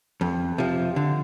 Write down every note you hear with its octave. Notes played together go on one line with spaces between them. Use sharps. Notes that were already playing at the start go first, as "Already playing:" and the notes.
F2
C3 F3
D3